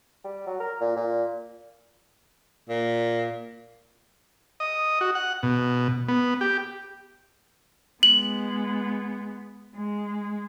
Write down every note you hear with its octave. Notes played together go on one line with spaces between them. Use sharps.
G3
F#3
A#4
A#2
A#2
A#2
D#5
F#4
F#5
B2
B3
G4
G#3 B3 F#7
G#3